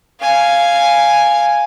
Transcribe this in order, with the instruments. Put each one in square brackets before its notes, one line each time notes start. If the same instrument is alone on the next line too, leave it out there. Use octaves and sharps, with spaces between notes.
[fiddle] F5 G#5